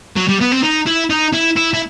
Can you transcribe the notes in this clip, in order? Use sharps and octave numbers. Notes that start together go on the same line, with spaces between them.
F#3
G3
B3
C4
D#4
E4
D#4
E4
E4
E4